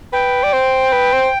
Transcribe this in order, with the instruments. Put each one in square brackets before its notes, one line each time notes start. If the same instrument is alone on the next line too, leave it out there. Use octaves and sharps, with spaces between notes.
[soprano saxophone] B4 [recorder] G5
[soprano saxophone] D5
C5
B4
C5